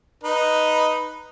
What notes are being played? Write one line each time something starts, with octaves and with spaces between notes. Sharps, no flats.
D#4 B4